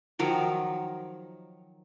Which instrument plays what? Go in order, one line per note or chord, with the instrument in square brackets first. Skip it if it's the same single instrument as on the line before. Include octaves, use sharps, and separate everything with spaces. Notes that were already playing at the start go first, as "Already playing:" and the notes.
[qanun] D#3 F3 F#3 A#4